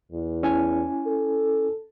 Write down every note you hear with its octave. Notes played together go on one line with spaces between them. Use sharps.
E2
C#4 E4 G#5
A4